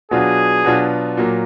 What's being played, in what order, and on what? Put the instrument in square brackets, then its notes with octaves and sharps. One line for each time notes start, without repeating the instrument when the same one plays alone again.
[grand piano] B2 F#3 B3 D4 F4 [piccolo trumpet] G#4
[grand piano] B2 F#3 B3 D4 F4
A#2 F#3 A#3